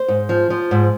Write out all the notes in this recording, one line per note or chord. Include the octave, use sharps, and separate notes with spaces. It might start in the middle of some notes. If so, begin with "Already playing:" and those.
Already playing: C5
G#2
F3
F3
G#2